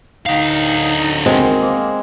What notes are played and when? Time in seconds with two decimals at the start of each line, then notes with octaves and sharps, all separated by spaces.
0.26 D2 D#4 F5
1.26 D#3 G#3 C4 F#4 C5
1.61 A#3